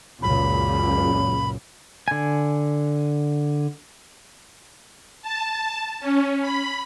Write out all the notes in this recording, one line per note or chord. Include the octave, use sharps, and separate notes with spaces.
C#2 F#2 A#2 B5
D3 G#5
A5
C#4
B5